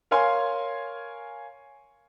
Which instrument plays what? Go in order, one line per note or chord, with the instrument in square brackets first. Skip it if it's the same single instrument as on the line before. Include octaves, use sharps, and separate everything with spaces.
[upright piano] A#4 C#5 F5 G#5 C6